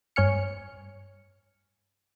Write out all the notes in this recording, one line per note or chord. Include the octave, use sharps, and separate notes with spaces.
G2 C#5 G#5 F6 C#7